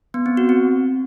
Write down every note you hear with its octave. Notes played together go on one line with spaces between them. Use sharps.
B3
C4
F#4
C4